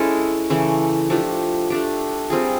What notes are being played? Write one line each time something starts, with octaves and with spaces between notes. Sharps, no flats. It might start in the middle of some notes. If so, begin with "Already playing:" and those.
Already playing: G#3 C#4 E4 A4
C#3 E3 A3
F3 A3 D4 G4
A3 D4 G4
G3 C4 F4 G#4